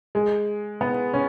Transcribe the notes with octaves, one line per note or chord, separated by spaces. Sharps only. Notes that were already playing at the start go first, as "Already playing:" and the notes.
G#3
B3
C#4